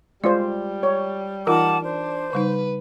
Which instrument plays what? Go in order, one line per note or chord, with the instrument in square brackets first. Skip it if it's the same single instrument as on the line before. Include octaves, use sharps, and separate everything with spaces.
[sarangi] G3 [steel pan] G#3 F4 C5 [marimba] D5
[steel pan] C#5
[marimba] E3 D#4 F4 [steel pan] A#4 [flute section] F#5 A5 D6
[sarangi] D4 [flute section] C5
[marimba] C#3 G3 D#4 [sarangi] B4